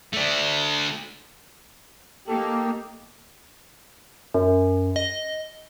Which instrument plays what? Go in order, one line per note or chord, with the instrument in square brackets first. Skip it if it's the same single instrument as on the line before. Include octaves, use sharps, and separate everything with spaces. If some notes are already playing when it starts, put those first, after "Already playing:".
[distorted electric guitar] A3 D4
[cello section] A#3 [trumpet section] D#4 G4 [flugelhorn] A4
[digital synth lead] F#2
D#5